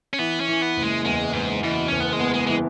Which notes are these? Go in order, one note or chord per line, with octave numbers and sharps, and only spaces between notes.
C#4
E3 B3
C#4
E3
B3
F#1
G#3
E2 G#3
G#2 B3
B2 E3
F#1 C#4
B3
G#3
B3
G#3
E3 G#3